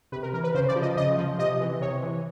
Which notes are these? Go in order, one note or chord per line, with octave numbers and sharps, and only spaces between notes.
C3 B4
A#4
E3 A#4
B4
C#3 C5
D5
F3
D#5
C#3 D#5
F3
C3 D#5
E3
C3 C#5
E3